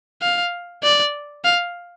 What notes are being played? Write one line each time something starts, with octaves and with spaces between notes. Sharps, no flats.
F5
D5
F5